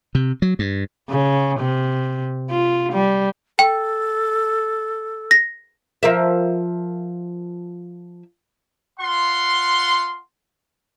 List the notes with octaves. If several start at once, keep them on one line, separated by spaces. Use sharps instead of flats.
C3
F#3
G2
C#3
C3
F4
G3
A4 G5
A#6
F3 A#4 E5
F4 F#5 C6